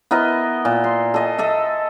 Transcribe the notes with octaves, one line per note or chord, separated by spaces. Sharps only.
B3 E4 A#4 D#5
A#2
C6
A4 D#5 G#5
A4 D#5 E5